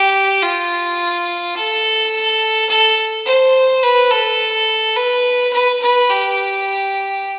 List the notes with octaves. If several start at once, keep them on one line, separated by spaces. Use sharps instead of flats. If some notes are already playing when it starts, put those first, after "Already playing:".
Already playing: G4
F4
A4
A4
C5
B4
A4
B4
B4
B4
G4